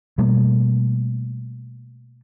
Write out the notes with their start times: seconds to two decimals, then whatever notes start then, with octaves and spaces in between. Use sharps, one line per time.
0.18 B2 G3 A3 A#3